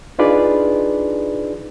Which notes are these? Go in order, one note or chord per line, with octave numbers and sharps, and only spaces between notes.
D4 D#4 F4 G#4 B4 D5